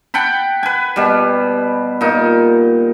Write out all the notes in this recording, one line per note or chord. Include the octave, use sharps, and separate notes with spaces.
F#5 G5 A5 B5
B4 G#5
B2 G3
A#2 D#4